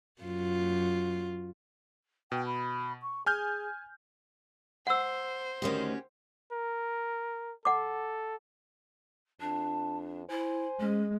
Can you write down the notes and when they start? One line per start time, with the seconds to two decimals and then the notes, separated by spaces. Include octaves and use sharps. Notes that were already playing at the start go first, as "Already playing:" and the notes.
0.22 F#2 F4
2.32 B2 G5
2.46 B5
3.02 C#6
3.26 G#4 G#5 F6 G6
4.87 C5 F#5 E6
5.62 D2 D#3 C4 C#4 F#4 G4
6.52 A#4
7.65 A4 F#5 D6
9.41 F2 D4 A5
10.29 E4 C5 G#5
10.80 G#3 C#4